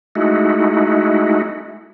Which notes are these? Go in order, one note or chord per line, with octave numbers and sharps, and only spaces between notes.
G#3 A3 D#4 E4 F#4